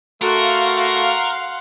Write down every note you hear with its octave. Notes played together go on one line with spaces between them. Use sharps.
A3 F#4 A#4 F5 F#5 C6